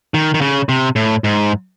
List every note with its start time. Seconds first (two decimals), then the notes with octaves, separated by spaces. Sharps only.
0.14 D#3
0.34 D#3
0.41 C#3
0.69 C3
0.96 A2
1.24 G#2